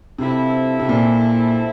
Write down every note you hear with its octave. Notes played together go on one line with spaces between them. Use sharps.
G2 C3 F3 C4 E4 A4
C3
A#2